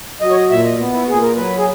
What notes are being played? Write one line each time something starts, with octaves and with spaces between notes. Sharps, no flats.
F#3 D#5
C#5
D#5
A#2 E5
D#5
B3
E4
F#4
A#2 G#4
A#4
F#3 B4
G#4